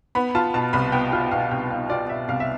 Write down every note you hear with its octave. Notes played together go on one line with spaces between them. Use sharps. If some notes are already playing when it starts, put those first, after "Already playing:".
B3 B5
F4 A5
B2 A5
C2 B5
B3 G5
F4 F5
B2 F5
C2 G5
B3 F5
F4 D5
B2 E5
C2 F5
E5